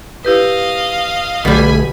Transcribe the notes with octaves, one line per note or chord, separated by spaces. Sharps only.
E4 G4 B4 D#5 F5
B1 B2 D3 G3 A3 G#5 B5